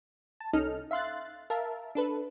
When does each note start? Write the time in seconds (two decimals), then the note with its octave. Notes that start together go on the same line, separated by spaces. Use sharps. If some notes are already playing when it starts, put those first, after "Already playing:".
0.40 A5
0.53 C2 C#4 D#4 A4 D#5 F6
0.91 E5 F5 C6 F#6 A6
1.50 A#4 E5 F5 A5
1.95 D4 A4 B4